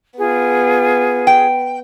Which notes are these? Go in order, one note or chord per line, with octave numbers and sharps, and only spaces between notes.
B3 F4 G#4
G5